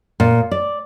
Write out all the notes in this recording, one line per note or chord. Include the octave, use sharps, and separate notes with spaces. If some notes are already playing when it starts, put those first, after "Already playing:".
A#2
D5